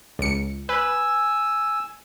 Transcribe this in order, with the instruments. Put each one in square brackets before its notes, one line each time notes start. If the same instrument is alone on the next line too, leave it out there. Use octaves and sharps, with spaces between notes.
[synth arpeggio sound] C#2 C#7
[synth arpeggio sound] B4 [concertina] G#5 E6